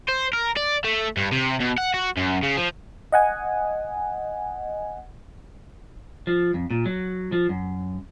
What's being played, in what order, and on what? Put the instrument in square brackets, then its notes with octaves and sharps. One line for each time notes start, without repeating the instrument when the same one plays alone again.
[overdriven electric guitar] C5
A#4
D5
A3
G2
C3
B2
F#5
F#4
F#2
C#3
F3
[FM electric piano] D#5 F#5 G#5
[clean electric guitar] F3
F2
A#2
F#3
F3
F#2